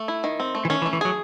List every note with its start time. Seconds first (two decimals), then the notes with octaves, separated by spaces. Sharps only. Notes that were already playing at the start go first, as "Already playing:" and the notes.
Already playing: A3
0.08 E4
0.24 D#3
0.40 C4
0.55 A3
0.65 E3
0.70 D#3 C#4
0.82 E3
0.86 A3
0.93 E3
1.01 F#3 G#4